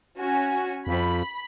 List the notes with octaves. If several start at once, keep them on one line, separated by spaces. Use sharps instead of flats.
C#4 F#4 G#5
F2 B5